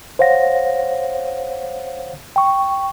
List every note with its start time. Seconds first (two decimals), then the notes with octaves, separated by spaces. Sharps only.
0.19 C5 C#5 F5 F#5 A#6
2.36 G5 C#6